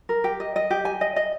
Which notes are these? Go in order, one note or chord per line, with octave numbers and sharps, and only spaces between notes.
A#4
G4
D#5
D#5
G4
G#5
D#5
D#5